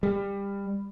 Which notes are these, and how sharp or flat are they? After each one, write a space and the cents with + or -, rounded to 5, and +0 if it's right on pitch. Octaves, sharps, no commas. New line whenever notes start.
G3 +25